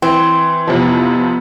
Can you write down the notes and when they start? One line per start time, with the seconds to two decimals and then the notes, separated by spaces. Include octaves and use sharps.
0.02 E3 C4
0.67 F2 C3 F3 B3